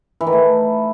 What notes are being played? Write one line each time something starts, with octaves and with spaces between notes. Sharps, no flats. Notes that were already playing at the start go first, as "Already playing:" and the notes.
E3
D#3
A3